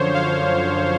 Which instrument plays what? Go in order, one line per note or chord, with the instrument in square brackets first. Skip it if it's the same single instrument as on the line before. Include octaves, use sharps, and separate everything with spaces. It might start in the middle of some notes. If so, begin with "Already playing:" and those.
Already playing: [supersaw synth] F#2 D3 F3 C5 C#5
F5